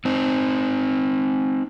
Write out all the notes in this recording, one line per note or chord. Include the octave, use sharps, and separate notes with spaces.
C4 D#4